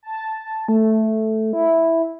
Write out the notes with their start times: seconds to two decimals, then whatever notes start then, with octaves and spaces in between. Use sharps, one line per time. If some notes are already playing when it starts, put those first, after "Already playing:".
0.03 A5
0.68 A3
1.53 E4